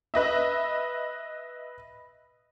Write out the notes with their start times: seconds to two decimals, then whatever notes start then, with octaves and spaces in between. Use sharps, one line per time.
0.14 B4 D#5 E5